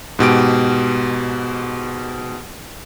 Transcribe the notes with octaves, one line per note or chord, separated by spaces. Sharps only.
G#2 B2 G4 D7